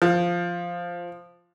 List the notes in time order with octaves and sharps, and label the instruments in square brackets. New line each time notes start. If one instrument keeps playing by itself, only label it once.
[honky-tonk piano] F3